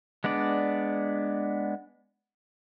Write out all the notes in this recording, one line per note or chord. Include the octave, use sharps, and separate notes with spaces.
G#3 B3 D4 D5